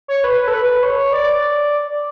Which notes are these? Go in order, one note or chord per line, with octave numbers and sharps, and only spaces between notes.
C#5
B4
B4
A4
B4
C#5
D5